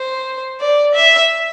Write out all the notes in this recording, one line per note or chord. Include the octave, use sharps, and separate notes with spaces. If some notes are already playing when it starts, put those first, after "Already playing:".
Already playing: C5
D5
E5